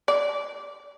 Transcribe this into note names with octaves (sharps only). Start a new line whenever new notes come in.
D5